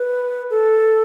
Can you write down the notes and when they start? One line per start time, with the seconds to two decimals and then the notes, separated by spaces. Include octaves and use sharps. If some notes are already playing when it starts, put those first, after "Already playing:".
Already playing: B4
0.50 A4